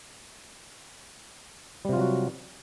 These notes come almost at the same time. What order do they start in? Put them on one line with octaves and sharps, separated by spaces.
G3 C3 F4 F#3 F#4